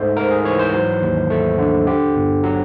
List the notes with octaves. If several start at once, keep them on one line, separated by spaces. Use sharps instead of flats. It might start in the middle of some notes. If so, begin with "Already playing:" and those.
Already playing: G#2 A3 C5
G#2 A#4
G#4
E3 C#5
C5
F#3
D#2
A3
D3
D3 G4
G1
F#3